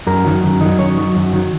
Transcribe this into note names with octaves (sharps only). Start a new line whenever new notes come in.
F#2 A#4
D#3 F#3
F#2
D#3 F#3
F#2 C#5
D#3 F#3
F#2
D#3 F#3